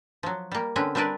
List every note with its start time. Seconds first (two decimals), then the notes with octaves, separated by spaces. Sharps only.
0.23 F3 F#3
0.52 G3 A#3
0.76 D3 C4 C#4 B4
0.95 G3 C4 D4 A#4 B4 D5